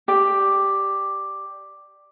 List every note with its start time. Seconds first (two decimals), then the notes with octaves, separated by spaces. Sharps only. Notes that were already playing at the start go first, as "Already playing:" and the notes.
0.08 G4 D5